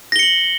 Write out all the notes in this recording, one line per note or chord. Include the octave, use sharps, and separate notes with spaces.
A#6 C#7 F#7 G7